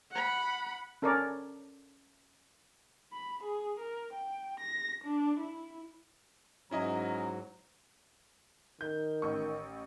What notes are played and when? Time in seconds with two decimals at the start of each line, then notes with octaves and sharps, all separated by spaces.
0.11 F#5 B5
1.02 C#4 A4 A#4 C#5 D5
3.13 B5
3.43 G#4
3.79 A#4
4.13 G5
4.60 A#6
5.04 D4
5.40 E4
6.71 G#2 F#3 C#4 E4 D#5 A#5
8.81 D#3 G6
9.22 A1 C#6